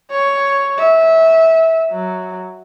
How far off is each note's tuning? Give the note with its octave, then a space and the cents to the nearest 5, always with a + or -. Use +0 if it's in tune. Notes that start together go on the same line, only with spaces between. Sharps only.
C#5 +5
E5 -20
F#3 +0